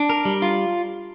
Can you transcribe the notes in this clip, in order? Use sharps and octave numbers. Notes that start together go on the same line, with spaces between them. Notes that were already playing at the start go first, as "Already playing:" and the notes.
Already playing: D4
A#4
G3
F4